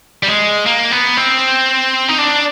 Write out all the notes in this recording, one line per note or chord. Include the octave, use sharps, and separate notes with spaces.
G3
G#3
A#3
B3
C4
D#4
D4